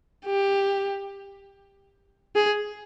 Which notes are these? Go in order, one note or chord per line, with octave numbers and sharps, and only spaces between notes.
G4
G#4